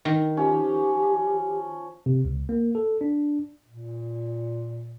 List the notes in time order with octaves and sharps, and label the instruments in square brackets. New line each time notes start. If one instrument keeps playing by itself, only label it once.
[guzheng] D#3
[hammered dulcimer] F3 C#4 [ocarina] G4
[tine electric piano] C3
C#2
A#3
A4
D4
[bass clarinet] A#2